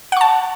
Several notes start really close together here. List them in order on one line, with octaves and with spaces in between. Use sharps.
F#5 C#6 A5